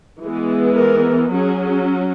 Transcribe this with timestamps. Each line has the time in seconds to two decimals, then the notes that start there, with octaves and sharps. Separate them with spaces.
0.21 E3 G#3 B3
0.76 A#4
1.31 F#3 C#4 G#4